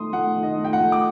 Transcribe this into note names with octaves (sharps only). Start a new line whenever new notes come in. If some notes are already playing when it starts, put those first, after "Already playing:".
Already playing: D#3 A3 D#4 C6 D#6
A3 F#5
D#3
D#5
A3
G5
F#5
A3
D6